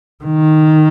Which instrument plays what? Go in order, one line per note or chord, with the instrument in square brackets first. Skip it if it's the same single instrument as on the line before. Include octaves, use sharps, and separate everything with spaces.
[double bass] D#3